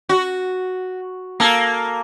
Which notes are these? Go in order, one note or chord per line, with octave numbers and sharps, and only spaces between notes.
F#4
A#3 A4